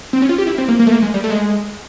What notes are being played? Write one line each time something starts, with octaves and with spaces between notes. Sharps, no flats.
C4
C#4
F4
G4
E4
C4
A#3
A#3
A3
A#3
G#3
G3
A3
G#3